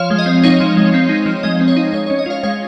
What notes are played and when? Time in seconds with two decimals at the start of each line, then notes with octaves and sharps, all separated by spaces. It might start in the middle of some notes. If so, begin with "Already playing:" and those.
Already playing: F3 C#5 F5
0.10 G#3
0.19 D#5
0.26 C4
0.44 D#4 C#5
0.60 F3
0.77 G#3
0.94 C4
1.09 D#4
1.26 F3
1.43 G#3 D#5
1.60 C4
1.68 C#5
1.76 D#4
1.93 G#3 C#5
2.06 C#4 C#5
2.19 D#5
2.26 F4 C#5 F5
2.43 G#3 C#5 F5